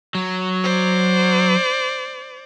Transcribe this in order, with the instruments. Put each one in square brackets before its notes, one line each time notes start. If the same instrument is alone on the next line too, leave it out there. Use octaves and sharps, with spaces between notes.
[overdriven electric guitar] F#3
[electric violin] C5 D5